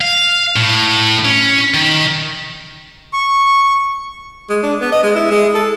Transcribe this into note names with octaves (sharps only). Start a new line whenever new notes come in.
F5
A2
C#4
D#3
C#6
G#3
D4
B3
D#5
G#3
E4
G#3
A4